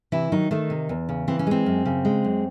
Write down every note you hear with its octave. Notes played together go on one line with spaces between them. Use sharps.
C3 E3 E4
D#3 F#3 D#4
D#3 A3 D#4
C3
E2
C#3
E3 C4
C#4
G#3 C4
F#2
C#3
G#3
F#2